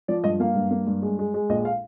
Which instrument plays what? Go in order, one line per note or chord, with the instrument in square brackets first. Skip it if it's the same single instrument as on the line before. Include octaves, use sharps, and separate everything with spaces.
[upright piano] F3 D5
G2 D#5
A#3 F5
G2
A#3
G2
G#3
G#3
G#3
A#1 D#5
F5